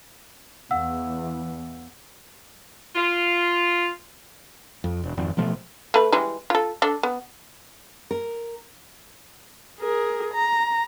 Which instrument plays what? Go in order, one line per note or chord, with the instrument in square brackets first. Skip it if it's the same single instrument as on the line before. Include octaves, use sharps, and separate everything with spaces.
[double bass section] E2 E3 [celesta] F5 F#5 E6
[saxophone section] F4
[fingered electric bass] F2
E1
G#1 F2
A1 B2 F3 A3
[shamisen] A3 B4
E3 G3 G#3
F4 A4
D4 A4
B3
[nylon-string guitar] A#4
[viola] G#4 A#4
A#5